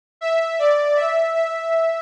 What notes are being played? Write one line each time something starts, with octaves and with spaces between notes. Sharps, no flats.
E5
D5
E5
E5